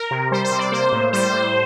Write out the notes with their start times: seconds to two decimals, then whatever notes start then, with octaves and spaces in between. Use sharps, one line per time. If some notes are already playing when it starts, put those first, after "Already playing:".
Already playing: A#4
0.11 C3
0.31 G3 C5
0.45 C5
0.52 C3
0.59 D5
0.72 A#3 C5
0.92 A2
1.13 G3 C5
1.33 A2